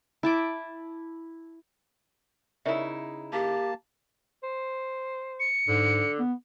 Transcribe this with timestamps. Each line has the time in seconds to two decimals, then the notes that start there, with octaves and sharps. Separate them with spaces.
0.23 E4 A5 D6
2.66 C#3 D#4 E4 A#4 D5 E5
3.33 A#3 G4 A5
4.43 C5
5.40 C#7
5.68 G#2 D3
6.19 B3